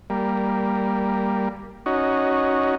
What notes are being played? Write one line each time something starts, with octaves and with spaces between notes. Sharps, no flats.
G3 A#3
C#4 D#4 F#4